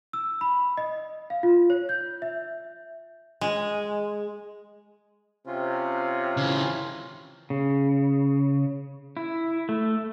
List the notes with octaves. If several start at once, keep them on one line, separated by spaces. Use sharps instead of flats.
E6
B5
D#5
F5
F4
C#5
G6
E5
G#3
C3 C#4 F4
C#3 E3
C#3
E4
A3